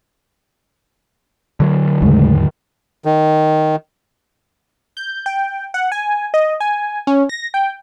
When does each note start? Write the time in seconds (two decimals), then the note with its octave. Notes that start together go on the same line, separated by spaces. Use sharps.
1.60 D3 F#3
2.02 D#2 G#2 C#3 G#3 A3
3.05 D#3
4.97 G6
5.26 G5
5.74 F#5
5.92 G#5
6.34 D#5
6.60 G#5
7.07 C#4
7.29 A#6
7.54 G5